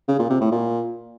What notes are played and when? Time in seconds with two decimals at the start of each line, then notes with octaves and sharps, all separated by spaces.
0.08 C#3
0.19 A#2
0.30 C3
0.41 A2
0.51 A#2